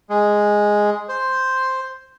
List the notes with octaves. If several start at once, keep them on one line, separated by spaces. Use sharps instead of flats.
G#3
C5